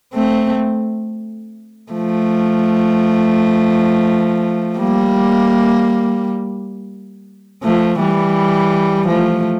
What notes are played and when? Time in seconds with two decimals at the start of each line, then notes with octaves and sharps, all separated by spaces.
0.14 A3 C4
1.93 F3 A3
4.78 G3 A#3
7.63 F3 A3
8.00 E3 G3
9.07 F3 A3